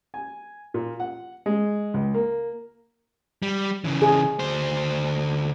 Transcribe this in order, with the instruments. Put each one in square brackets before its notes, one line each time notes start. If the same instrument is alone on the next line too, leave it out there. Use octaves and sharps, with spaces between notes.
[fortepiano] G#5
A#2
F#5
G#3
C#2
A#3
[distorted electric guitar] G3
C#3 E3
[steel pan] G#4
[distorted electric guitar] D2 C5